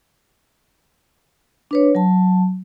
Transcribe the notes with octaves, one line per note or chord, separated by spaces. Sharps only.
D4 B4 C#5
F#3 A5